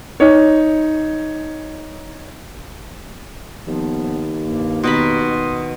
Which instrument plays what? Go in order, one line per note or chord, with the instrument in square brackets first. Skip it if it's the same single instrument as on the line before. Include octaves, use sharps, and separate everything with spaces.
[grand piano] D#4 C#5
[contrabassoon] D#2 [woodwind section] F3 B3
[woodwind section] G2 A#3
[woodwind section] F2 C6 D#6 [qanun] B2 D#3 B5